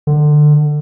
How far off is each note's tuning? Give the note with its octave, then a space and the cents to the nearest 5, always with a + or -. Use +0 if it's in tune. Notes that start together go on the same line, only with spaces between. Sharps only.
D3 +25